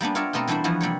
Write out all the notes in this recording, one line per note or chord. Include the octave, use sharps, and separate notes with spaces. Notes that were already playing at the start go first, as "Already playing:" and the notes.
G3 A#3 B3 D4
F4 A#4 C#5 D5 E5
B2 A3 B3 C4 A#4
E3 G3 A3 D4 E4 C5
E3 F3 G3 B3 F#4
C3 G3 A#3 C#5